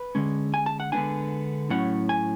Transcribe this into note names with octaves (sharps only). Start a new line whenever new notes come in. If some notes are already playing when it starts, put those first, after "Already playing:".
Already playing: B4
D3 G#3 C#4
G#5
A5
F#5
D3 G#3 B3 D4 G#5
A2 F#3 C#4 F#5
G#5